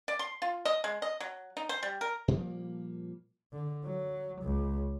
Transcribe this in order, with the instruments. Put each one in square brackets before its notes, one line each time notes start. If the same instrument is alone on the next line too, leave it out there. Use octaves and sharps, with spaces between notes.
[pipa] D5
C6
F4
D#5
G#3
D#5
F#3
D#4
C5
G3
A#4
[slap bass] A#2 F3 G3 A#3
[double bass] D3
F#3
C#2